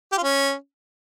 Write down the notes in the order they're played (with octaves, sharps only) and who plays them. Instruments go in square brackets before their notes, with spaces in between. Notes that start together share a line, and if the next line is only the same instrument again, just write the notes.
[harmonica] G4
F4
C#4